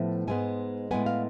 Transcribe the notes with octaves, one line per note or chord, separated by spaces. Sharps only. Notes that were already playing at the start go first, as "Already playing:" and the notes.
Already playing: A2 F3 B3 E5
G#2 G#3 B3 G#5
A2 G#3 B3 G#5
F5